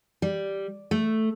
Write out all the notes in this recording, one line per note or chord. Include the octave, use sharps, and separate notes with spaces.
G3
A3